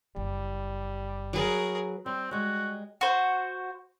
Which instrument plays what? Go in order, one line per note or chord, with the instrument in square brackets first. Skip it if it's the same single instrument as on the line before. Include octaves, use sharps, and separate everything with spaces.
[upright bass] F#1 [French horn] G3
[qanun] F#3 B4 [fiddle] G#4 A#4
[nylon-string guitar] G3 [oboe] C4
[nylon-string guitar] G3 G#3 [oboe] F#4
[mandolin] F#4 C5